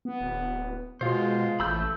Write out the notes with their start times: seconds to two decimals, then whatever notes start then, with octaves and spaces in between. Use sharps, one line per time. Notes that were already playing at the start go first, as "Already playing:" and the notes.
0.05 B3
0.21 D1
1.01 B2 G#3 F4 C5
1.60 A1 A3 B5 E6 G6